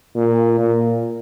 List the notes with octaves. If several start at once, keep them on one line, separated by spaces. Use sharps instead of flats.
A#2
A#2